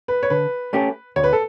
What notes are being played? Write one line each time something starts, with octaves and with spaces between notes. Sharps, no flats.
B4
C#5
D3 B4
A3 C#4 G4
D2 C#5
B4
A4